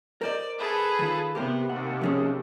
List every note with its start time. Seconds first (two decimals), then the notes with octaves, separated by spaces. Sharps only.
0.21 A#4 C5 D5 D#5
0.59 G#4 A4 B4
0.99 D#3 F4
1.35 C3 B3 G4 A#4 C5
1.69 D#2 C3 F#5
2.01 F3 C#4 G#4